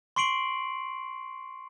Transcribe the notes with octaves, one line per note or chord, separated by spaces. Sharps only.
C6 C#6 C7 D7 F#7